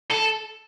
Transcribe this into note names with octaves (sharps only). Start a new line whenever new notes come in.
A4